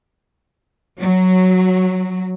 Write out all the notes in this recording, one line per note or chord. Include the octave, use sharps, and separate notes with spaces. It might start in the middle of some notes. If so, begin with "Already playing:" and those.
F#3